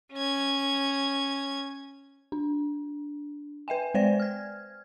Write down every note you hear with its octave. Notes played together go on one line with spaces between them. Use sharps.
C#4 G#6
D4
B4 E5 G5 G#5
G#3 C5 D5 G5 G#5 A#6
F6 G#6